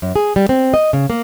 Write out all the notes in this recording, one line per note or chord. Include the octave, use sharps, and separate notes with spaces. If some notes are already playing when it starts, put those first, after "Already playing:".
F#2
G#4
G3
C4
D#5
C#3
A#3